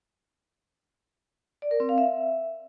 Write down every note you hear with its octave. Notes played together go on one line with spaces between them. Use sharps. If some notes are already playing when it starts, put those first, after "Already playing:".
D5
A#4
C4
F5
E5